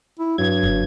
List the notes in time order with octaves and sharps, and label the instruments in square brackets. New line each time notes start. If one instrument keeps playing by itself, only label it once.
[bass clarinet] E4
[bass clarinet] G2 [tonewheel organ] F#3 G#6
[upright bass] F#1